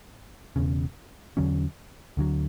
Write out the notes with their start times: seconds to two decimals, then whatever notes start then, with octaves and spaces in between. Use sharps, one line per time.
0.56 E1 E2 C#3
1.37 E2 D3 F#3 C#4
2.17 D2 D3 F#3